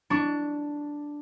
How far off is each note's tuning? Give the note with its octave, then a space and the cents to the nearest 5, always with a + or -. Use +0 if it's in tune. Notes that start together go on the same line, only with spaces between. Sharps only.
D4 +0 C#6 +25